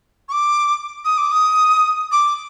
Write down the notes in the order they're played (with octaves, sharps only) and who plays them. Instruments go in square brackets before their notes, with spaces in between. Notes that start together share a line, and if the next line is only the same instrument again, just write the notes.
[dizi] C#6
D6
D#6
D6
D#6
D6